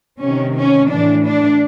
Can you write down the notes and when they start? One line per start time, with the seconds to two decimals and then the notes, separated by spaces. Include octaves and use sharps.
0.19 C3 D#3 C#4
0.54 C#4
0.89 A2 E3 D4
1.24 D4